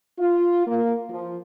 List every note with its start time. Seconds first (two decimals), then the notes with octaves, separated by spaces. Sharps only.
0.19 F4
0.67 A#3
1.10 F3